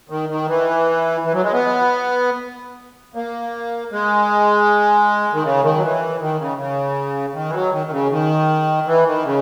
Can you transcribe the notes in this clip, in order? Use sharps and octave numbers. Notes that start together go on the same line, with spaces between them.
D#3
D#3
E3
E3
F#3
G#3
B3
A#3
G#3
D#3
C#3
D#3
F#3
E3
D#3
C#3
C#3
D#3
E3
F#3
D#3
D#3
C#3
D#3
E3
D#3
C#3